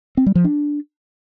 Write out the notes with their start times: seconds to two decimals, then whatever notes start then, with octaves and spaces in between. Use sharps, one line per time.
0.17 C4
0.26 G3
0.35 F3
0.44 D4